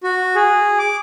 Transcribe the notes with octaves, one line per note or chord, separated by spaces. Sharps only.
F#4
G#4
D6